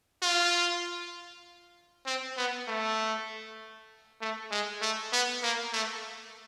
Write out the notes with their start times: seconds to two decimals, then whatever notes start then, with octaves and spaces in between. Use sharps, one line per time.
0.22 F4
2.06 C4
2.37 B3
2.68 A3
4.21 A3
4.51 G#3
4.82 A3
5.13 B3
5.43 A#3
5.73 A3